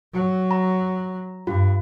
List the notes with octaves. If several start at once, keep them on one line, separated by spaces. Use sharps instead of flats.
F#3
A#5
G2 F4